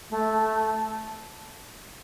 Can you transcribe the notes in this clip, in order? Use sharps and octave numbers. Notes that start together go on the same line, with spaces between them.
A3